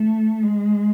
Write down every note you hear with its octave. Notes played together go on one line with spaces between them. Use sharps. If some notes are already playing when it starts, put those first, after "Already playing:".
Already playing: A3
G#3